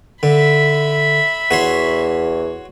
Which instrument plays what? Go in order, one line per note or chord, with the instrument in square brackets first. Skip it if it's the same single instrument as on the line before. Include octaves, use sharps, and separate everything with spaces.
[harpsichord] D3 [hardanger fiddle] E5 B5
[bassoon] E2 [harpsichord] F#4 C#5 C6